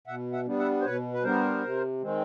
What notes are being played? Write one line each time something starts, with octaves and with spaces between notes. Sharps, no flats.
B2 E5 F#5
E5 F#5
G3 B3 D4
E5 F#5
C5
B2 B4 C#5
B4
G3 B3 D4 A#4 C5
C3
D#3 G#3 C4